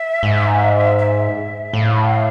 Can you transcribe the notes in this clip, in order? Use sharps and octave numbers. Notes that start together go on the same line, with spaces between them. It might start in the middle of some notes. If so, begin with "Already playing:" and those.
Already playing: E5
G#2
E5
A2 F5